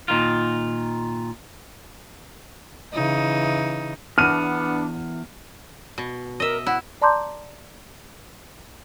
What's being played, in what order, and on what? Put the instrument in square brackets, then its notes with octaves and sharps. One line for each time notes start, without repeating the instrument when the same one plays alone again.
[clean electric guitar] A#2 D#3 F4
[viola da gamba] C#3 E3 D#4
[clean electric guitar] E2 [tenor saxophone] B3 [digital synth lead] D4 [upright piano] F6 D#7
[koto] B2
[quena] A#4 [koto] D#5 E5
[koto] E4 [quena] F#5
[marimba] D5 A5 A#5 C6 D6 G6